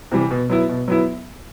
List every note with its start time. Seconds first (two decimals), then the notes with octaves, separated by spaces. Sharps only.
0.12 C3 E3 G3
0.31 B2
0.50 F#3 B3 E4
0.69 B2
0.88 F#3 B3 E4